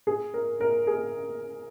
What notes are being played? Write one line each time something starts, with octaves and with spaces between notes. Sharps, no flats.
G#4
A#4
A#4
G#4